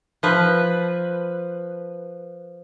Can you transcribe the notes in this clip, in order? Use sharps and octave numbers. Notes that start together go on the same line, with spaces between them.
F3 B4